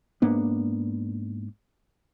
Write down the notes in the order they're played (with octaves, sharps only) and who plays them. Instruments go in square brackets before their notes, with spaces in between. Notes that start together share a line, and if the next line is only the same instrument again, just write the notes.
[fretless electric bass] G#2 A#3 B3 D4